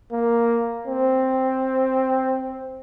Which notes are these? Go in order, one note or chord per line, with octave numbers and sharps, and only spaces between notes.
A#3
C4